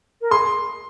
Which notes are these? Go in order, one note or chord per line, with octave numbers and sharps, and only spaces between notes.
A#4
G#4 C6